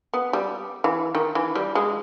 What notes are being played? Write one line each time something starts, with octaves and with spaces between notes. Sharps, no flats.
B3
G3
E3
D#3
E3
G3
G#3